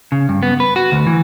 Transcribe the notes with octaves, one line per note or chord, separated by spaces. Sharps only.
C#3
G2
B3
B4
F#4
D2
E3